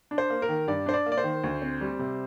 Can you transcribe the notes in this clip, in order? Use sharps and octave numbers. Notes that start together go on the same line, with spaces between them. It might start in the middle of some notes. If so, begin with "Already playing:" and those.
D4
C5
A#3
A#4
D#3
G2 D5
D4 C5
D5
A#3
D5
C5
D#3
D2
C4
G3
C3